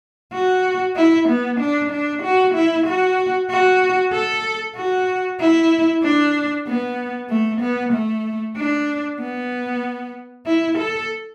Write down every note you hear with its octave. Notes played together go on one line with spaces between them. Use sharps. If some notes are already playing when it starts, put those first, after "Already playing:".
F#4
E4
B3
D4
D4
F#4
E4
F#4
F#4
A4
F#4
E4
D4
B3
A3
B3
A3
D4
B3
E4
A4